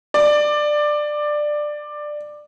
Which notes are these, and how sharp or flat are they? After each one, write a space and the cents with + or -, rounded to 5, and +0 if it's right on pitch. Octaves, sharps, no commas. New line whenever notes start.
D5 +15